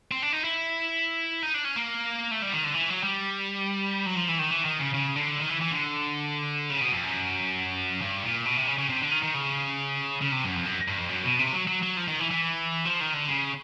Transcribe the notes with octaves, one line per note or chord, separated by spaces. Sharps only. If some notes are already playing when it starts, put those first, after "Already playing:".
C4
D4
D#4
E4
D#4
D4
C#4
A#3
A3
G3
D#3
D3
E3
F#3
G3
F#3
F3
E3
D#3
E3
D#3
C#3
C#3
D3
D#3
E3
E3
D3
C#3
B2
F2
F#2
G2
A#2
B2
C3
C#3
C#3
C3
D3
D#3
D#3
C#3
C#3
C3
F#2
F2
F#2
G2
F2
F#2
B2
C3
F#3
F#3
F#3
F3
D#3
E3
E3
F3
D#3
D3
C#3